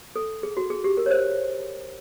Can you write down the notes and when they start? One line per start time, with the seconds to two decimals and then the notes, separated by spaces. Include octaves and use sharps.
0.16 A4
0.43 G#4
0.57 F#4
0.70 G#4
0.84 G4
0.97 A#4
1.06 C#5
1.11 C5